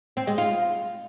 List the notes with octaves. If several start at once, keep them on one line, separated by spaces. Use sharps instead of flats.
C4
G#3
F4